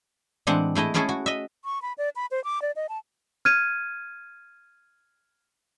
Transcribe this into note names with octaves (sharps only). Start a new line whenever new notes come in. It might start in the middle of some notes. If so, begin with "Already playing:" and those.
A2 E3 G#3 C4 D4 F#5
G#3 A3 E4 D#5
G#3 A3 C#4 E4 G#4 A4
F#4
D#5 E5
C#6
B5
D5
B5
C5
D6
D5
D#5
A5
F6 G#6 D#7